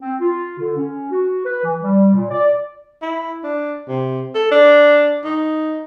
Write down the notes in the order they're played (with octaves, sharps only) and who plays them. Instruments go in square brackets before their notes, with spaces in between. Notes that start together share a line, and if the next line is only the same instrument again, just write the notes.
[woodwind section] C4
F4
D3
C#4
F#4
B4
E3
G3
A#2
D5
[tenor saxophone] E4
D4
C3
A4
D4
D#4